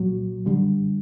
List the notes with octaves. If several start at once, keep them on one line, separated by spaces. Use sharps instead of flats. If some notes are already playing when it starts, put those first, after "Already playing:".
Already playing: C2 A#2 F#3
F#2 D3 G3